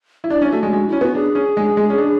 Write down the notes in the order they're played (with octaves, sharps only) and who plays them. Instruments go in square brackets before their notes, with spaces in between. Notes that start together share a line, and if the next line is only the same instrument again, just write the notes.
[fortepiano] E4
[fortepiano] D4 [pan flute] D5
[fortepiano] C#4
[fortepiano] A3 [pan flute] F#4
[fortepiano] G#3
G#3
[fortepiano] C#4 [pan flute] E4
[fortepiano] B3 [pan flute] F#4
[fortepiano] D4 [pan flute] G#4
[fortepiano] C#4
G#3
G#3
C#4
D4